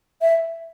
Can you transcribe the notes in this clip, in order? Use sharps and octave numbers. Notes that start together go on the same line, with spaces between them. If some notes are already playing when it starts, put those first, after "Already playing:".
E5